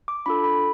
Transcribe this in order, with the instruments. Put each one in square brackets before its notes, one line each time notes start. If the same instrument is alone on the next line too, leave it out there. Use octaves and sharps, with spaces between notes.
[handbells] D6
D4 F4 A4 B5
B5